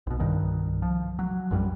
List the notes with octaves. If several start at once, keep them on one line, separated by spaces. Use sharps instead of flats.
B1 B2
C2 G2 D#3
F3
F#3
A#1 F#2 C#3 G3